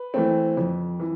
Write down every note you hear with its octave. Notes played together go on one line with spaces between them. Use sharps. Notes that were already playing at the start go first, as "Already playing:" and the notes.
Already playing: B4
E3 A3 C4
F2
E3